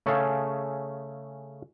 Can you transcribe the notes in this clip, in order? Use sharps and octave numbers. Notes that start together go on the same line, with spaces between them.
C#3 A3 C#4 G#4 A4 F5